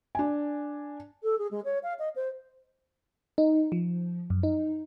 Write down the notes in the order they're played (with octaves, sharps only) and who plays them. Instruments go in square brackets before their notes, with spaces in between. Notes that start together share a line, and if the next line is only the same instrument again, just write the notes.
[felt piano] D4 G#5
[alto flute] A4
G#4
G#3
C#5
F5
D#5
C5
[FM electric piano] D#4
F3
F#2
D#4